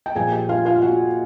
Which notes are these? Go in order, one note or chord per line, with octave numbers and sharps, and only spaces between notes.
G5
A#2 F3 A#3 G#4 G#5
G4 G5
F4 F5
F4 F5
F5
F#4 F#5